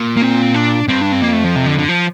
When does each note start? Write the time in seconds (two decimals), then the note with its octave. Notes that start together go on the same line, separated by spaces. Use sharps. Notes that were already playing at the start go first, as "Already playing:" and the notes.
Already playing: A#2
0.17 A#3
0.22 C4
0.54 D4
0.88 G2 C4
1.01 D4
1.12 C4
1.22 F2 A#3
1.33 A3
1.44 F3
1.55 C3
1.66 D3
1.78 D3
1.89 F3